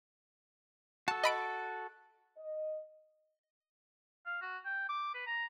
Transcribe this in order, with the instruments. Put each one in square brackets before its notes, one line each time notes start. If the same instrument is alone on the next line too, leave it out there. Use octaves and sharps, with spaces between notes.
[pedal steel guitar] F#4 A4 [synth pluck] A5
[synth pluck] D#5 B5 D7
[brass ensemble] D#5
[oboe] F5
F#4
G5
D6
B4
A#5